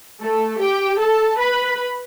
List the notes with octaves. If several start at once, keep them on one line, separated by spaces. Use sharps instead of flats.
A3 A4
G4 G5
A4 A5
B4 B5